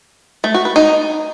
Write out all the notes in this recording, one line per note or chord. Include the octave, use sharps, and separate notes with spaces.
A3
F#4
B4
D#4